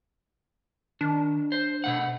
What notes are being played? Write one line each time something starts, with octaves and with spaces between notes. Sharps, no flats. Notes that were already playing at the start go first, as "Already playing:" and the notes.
D#3 D4
C5
B2 A3 F#5